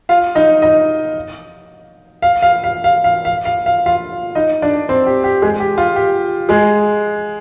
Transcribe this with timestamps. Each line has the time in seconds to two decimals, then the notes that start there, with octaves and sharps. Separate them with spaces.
0.09 F4 F5
0.35 D#4 D#5
0.62 D#4 D#5
2.22 F5
2.42 F5
2.64 F5
2.84 F5
3.04 F5
3.25 F5
3.45 F5
3.66 F5
3.86 F4 F5
4.35 D#4 D#5
4.62 D4 D5
4.89 C4 C5
5.06 G4
5.24 G4
5.42 G#3 G#4
5.60 G4
5.78 F4
5.96 G4
6.49 G#3 G#4